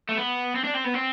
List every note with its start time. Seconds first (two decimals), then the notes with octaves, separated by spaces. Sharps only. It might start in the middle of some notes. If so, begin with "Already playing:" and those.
0.09 A3
0.17 B3
0.55 C4
0.65 D4
0.75 C4
0.85 B3
0.94 C4